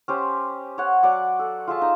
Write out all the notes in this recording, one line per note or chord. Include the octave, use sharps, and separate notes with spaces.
C#4 G4 C5
C#5 F#5
F#3 D5 F#5
A4
F4 G#4 E5 A5
D#4